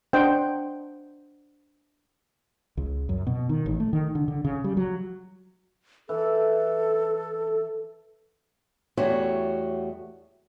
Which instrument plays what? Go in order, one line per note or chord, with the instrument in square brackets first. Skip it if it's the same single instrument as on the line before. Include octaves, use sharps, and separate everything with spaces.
[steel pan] D4 C5 D#5 F#5 G5
[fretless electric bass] C#2
F#2
B2
D#3
A1
A3
D#3
D3
D3
C#3
G3
F#3
[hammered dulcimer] E3 [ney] A4
[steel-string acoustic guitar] E2 A2 G3 A3 F#4 C#5